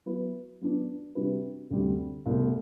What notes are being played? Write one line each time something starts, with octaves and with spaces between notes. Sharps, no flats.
F#3 B3 E4 B4
F#3 B3 D4
C3 G3 D4 F#4 B4
D2 C3 G3 C4
C2 B2 A3 C4